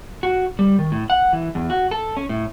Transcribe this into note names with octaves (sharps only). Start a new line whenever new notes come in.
F#4
G3
D#3
A2
F#5
E3
E2
F#4
A4
C#4
A2